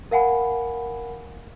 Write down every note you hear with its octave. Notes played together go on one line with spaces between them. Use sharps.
A#4 F5 F#5 G#5 B5